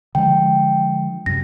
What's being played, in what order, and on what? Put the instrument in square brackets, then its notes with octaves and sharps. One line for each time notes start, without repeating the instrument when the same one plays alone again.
[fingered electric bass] D3 F3 G#3 [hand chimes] G5
[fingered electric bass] F#2 C3 [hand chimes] A#6